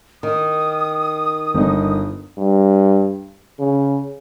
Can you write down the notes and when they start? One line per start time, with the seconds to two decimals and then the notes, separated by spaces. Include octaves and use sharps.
0.23 D#3 D#6
1.55 G1 D#4
2.38 G2
3.59 C#3